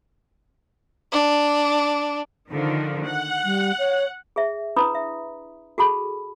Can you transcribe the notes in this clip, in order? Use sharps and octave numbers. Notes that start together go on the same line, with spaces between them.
D4
D3 D#3 F3
F#5
G3
C#5
G#4 E5
D4 E4 B4 A#5 B5 D#6
E5
F#4 G#4 A4 A5 B5